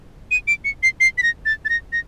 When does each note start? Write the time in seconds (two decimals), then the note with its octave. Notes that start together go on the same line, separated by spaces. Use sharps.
0.31 D#7
0.48 D7
0.65 C#7
0.83 C7
1.00 C7
1.18 B6
1.23 A#6
1.46 A6
1.65 A6
1.69 A#6
1.93 A#6